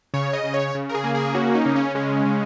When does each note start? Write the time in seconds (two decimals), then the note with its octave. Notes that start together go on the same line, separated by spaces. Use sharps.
0.14 C#3 C#5
0.33 D#5
0.44 C#3
0.54 C#5
0.75 C#3
0.89 A#4
0.95 G#4
1.04 A#3
1.15 G#4
1.35 C#4 F#4
1.55 D#4
1.66 C#3
1.76 C#4
1.95 G#3 C#4
2.26 C#3